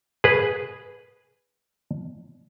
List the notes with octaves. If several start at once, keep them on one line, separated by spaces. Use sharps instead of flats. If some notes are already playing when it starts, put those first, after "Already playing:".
G#4 B4